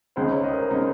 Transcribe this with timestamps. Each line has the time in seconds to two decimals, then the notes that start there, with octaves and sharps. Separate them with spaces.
0.16 C#2 C#3 G#3 D#4 C5
0.30 C#5
0.44 D#5
0.53 A#4
0.58 C5
0.71 C#3 G#3 D#4